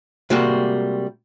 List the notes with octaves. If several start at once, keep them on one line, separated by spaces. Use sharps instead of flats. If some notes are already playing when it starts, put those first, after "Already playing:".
C3 G3 G#3 A#3 F#4